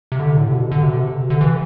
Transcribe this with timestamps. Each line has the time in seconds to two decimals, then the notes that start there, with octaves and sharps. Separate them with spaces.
0.12 C3
0.19 D3
0.37 A2
0.48 C3
0.54 B2
0.71 D3
0.83 C3
0.94 B2
1.05 C3
1.30 D3
1.41 E3